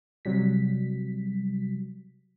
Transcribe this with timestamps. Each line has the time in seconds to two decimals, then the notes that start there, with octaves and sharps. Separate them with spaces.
0.25 C3 F#3 G3 B6